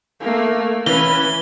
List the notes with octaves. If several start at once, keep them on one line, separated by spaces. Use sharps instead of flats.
A3 A#3
E3 C#4 B4 G7